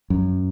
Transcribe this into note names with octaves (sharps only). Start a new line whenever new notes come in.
F#2